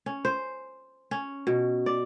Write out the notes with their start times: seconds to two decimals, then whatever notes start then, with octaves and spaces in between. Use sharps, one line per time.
0.06 C#4
0.25 C5
1.11 C#4
1.47 B2
1.86 D5